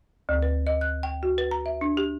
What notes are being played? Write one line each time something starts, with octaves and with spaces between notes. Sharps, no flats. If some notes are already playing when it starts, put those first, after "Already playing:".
D2
B4
D#5
F#6
G5
F#4
B4
A#5
E5
D4
G4